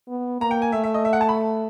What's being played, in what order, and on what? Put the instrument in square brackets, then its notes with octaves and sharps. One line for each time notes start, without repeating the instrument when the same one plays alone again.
[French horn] B3
[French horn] A#3 [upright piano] A#5
[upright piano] G5
G#5
[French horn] A3 [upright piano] E5
[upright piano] E5
D#5
E5
F#5
A5
B5